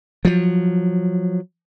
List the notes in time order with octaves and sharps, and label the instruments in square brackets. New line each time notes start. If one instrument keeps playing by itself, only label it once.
[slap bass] F3 F#3